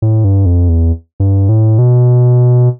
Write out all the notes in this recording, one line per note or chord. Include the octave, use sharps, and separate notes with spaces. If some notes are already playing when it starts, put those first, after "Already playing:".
A2
G2
F2
E2
G2
A2
B2